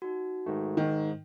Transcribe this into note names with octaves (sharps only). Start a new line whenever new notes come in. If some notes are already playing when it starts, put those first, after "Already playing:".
D#4 F#4
G#2 D#3 A3
G#2 D#3